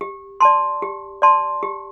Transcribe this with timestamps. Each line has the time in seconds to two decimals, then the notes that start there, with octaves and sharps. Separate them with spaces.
0.01 G4
0.40 D5 A5 C6
0.82 G4
1.22 D5 A5 C6
1.63 G4